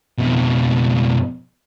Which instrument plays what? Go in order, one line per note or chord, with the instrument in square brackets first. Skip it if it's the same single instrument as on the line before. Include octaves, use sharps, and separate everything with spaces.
[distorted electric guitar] F2 B2